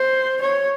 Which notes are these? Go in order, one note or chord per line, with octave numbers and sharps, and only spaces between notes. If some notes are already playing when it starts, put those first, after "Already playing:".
Already playing: C5
C#5